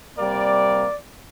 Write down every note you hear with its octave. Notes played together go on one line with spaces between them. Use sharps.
C3 G3 A#3 D5